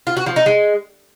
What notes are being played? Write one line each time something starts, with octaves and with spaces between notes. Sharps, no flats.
F4
F#4
F3
D#4
G#3